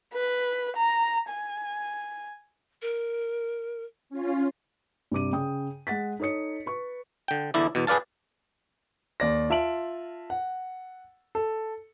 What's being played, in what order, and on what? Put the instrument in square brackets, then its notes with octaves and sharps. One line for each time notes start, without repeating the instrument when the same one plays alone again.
[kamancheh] B4
A#5
G#5
[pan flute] A#4
[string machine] C#4 F4
[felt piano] G2 C3 D6 D#7
C#3 G5 D#6
G#3 F#5 A6 B6
D#4 A4 C#5 D#6 C#7
B4 C#6
[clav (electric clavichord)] D3 G5
E2 D3 E4 D5
E2 B2
G#4 B4 D5 F5 A5
[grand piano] D#2 D5 A#6
F4 E5 A5 D7 F#7
F#5
A4